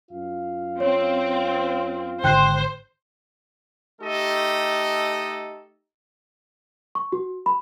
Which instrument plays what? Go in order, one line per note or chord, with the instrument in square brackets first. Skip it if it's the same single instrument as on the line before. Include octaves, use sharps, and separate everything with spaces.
[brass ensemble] F#2 F4 F5
[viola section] C4 [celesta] C#5
[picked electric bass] G#1 G#2 D3 [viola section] C5 [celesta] G5 F#6
[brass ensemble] A3 D#4 G4 A4 D#5
[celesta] C#6
F#4
B5